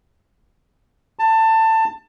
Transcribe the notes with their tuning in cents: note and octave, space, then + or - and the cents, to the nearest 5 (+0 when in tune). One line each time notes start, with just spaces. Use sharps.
A5 +20